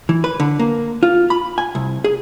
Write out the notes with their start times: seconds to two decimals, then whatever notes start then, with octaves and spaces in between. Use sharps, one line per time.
0.09 E3
0.24 B4
0.40 D3
0.59 A#3
1.03 F4
1.30 B5
1.58 G#5
1.75 C2
2.04 G#4